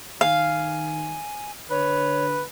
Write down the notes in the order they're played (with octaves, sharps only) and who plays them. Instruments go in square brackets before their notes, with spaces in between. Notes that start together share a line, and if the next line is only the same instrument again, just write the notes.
[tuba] D#3 [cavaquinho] F5 [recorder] G#5
[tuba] D3 [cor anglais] B4 [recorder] C#5